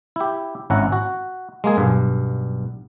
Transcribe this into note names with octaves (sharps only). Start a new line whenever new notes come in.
E4 G4
G#1 C#4 E4 F#5 A#5
F#4
G#3 A#3 G#4
B1 G2